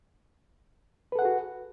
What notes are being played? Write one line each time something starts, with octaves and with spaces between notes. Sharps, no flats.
F#4 G#4 A4 B4 F#5